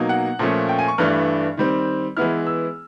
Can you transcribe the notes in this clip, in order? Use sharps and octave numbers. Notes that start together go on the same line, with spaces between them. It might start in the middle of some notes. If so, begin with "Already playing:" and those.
Already playing: B2 F#3 A#3 D#4
F#5
A#2 F3 A3 C#4
G5
G#5
C#6
G2 E3 A3 D4 F6
D#3 G3 C4
E3 G#3 B3 E4 F6
E6